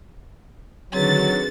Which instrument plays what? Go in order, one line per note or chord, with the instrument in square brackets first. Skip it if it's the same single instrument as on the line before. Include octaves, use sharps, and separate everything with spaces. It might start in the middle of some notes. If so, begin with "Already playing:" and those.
[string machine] D3 D#3 F#4 [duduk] F#3 [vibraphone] C4 G#4 B4 [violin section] A6